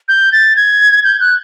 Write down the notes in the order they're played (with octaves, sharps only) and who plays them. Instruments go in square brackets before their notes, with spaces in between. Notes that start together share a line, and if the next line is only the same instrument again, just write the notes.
[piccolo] G6
A6
G#6
G6
F#6